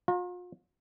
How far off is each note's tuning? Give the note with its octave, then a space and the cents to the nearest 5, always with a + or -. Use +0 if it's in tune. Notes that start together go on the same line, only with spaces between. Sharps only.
F4 +40 A#5 -5